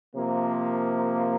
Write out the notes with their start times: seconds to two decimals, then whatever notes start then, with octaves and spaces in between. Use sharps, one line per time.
0.14 C3 F3 A#3